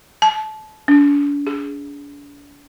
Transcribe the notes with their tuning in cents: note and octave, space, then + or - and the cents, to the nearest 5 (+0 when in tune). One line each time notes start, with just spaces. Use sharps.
A5 -25
D4 -40
G#4 +0